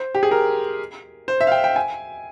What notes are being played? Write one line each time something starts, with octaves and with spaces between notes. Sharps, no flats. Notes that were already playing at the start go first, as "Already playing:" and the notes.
Already playing: C5
G4
G#4
A#4
C5
E5
F5
G5
G5
G#5